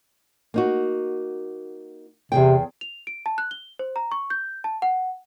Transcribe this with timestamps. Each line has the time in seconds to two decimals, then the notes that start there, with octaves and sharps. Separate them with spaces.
0.54 A#3 D#4 F#4
2.32 E2 C3 G#4 G5
2.81 F7
3.07 D7
3.26 A5
3.38 F#6
3.51 G7
3.79 C5
3.96 A#5
4.12 C#6
4.30 G6
4.64 A5
4.82 F#5